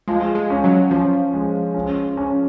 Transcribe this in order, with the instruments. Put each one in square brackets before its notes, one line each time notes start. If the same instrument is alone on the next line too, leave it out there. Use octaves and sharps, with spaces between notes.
[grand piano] F3 [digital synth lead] G#3
[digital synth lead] G#3
[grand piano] C#4
[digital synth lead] F#3
[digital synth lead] F3 [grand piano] C#4
[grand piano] G#3
C#4
C#4